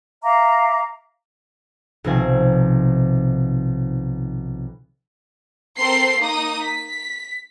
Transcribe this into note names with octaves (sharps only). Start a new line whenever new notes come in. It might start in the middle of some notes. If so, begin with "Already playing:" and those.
E5 F5 A#5 D6
B1 C3 D#3 F3 C4 G#5
C4 A4 A#4 C6 C7
A#3 D#4 D#6
B6